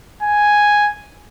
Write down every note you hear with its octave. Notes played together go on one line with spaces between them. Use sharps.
G#5